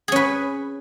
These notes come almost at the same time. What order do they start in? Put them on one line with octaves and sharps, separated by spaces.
G#4 C#4 B4